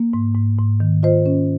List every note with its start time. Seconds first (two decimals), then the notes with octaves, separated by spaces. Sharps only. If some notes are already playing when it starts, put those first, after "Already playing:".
Already playing: A#3
0.13 G#2
0.35 G#2
0.58 G#2
0.80 D#3
1.03 F4 C5 D#5
1.26 C#4